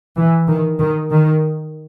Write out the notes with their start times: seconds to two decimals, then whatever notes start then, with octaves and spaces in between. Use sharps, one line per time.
0.17 E3
0.48 D#3
0.79 D#3
1.10 D#3